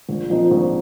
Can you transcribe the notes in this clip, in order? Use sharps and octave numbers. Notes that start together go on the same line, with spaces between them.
A#1
A#2 F3 C4 D#4
A#1